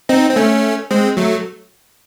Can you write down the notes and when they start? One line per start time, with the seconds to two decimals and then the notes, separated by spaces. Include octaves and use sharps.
0.09 C4 D#4
0.30 C4
0.36 A3 C#4
0.91 G#3 C4
1.17 F#3 A3